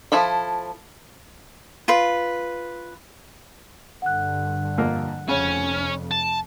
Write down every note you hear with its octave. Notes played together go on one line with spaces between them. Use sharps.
F3 E4 A4 B5
F4 B4
G2 D3 F#5 F#6
F2 A#2 A#3
F1 F2 C#3 C#4 C#5
A5